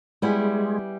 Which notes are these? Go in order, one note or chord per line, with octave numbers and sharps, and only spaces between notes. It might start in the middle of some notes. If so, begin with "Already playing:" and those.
G3 G#3 B3 E4 G#4